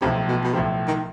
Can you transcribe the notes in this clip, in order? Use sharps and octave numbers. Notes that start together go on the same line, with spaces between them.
B1 A2 C3 F3
B2
B2
B1 A2 C3 F3
D#3